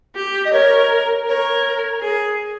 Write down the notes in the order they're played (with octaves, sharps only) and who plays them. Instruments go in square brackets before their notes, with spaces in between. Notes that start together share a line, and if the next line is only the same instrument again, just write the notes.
[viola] G4
[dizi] D#5
[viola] A#4 [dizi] C#5
[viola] A#4 [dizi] C#5
[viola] G#4